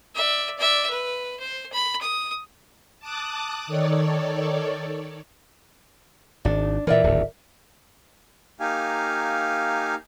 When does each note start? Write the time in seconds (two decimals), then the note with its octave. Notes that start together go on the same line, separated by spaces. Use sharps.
0.15 D5 E5
0.58 D5 E5
0.90 B4
1.40 C5
1.73 B5
2.01 D#6
3.00 A5 D6 D#6 F#6
3.67 D#3 A4 C#5 D5
6.45 G#1 D4
6.87 A#2 E3 A#4 D5 E5
7.04 D1 G#1 D2
8.60 A#3 D#4 G4 F5 G#5